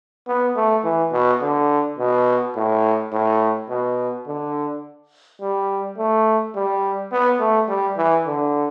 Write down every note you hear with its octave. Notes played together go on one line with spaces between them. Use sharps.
B3
A3
E3
B2
D3
B2
A2
A2
B2
D3
G3
A3
G3
B3
A3
G3
E3
D3